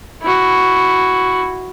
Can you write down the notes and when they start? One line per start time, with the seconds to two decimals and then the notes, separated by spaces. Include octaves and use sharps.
0.22 E4 F#4